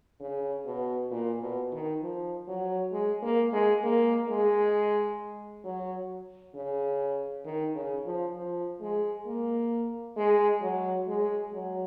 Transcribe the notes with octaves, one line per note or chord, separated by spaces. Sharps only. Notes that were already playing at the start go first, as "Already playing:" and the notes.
C#3
B2
A#2
B2
D#3
F3
F#3
G#3
A#3
G#3
A#3
G#3
F#3
C#3
D#3
C#3
F3
F3
G#3
A#3
G#3
F#3
G#3
F#3